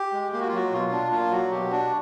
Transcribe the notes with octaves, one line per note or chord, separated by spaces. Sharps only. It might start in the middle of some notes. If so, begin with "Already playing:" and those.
Already playing: G4
G#3
A#3 G4
F#4
F4
F#3 F#4
B2 F4
D4
A#3 F4
F#3 F#4
B2 G4
D4 F#4